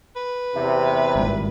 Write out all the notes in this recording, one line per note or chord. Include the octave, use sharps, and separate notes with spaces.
B4
E2 C3 E5
G#1 G2 A#2